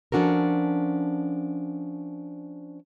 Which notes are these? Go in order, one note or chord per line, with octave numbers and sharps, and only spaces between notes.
F3 C#4 D4 F#4 A4 A#4